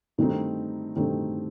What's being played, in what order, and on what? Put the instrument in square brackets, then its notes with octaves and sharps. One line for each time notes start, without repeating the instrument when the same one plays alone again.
[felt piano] G2 D#3 A3 C4 D#4
G2 D#3 A3 C4 D#4